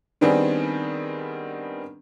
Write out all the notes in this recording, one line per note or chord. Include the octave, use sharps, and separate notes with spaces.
D#3 G3 B3 C4 D4 G#4